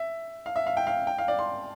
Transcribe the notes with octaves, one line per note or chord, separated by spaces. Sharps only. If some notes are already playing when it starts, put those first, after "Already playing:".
Already playing: E5
F5
E5
F5
G5
F5
G5
F5
D5
C6